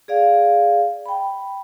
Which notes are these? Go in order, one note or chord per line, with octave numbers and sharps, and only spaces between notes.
G#4 D5 F5
G5 B5